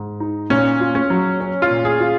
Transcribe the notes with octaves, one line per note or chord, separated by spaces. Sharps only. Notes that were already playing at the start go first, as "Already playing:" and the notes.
Already playing: G#2
D#4
A#2 C#4
F4
C#4
F#3
C#4
F4
A#2
G#4
F4